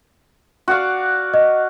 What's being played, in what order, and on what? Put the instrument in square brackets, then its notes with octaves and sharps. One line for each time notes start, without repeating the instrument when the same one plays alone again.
[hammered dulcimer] F#4 D5 F5
[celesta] D#5